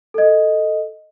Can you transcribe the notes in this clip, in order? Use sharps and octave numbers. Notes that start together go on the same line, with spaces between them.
A4 D#5